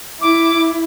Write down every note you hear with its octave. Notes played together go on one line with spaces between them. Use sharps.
E4 D6